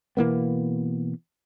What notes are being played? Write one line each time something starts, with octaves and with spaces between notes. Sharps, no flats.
B2 E3 A#3 B3